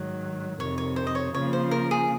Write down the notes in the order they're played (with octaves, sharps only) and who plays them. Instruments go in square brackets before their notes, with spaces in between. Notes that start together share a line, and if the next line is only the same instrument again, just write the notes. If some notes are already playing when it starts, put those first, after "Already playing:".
Already playing: [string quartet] G#2 D#3 F#3
[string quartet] F2 C3 D#3 [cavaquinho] C#5
[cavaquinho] C#5
C5
D#5
C#5
[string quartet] C#3 F3 A#3 [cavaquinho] C#5
[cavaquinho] C5
A#4
G#4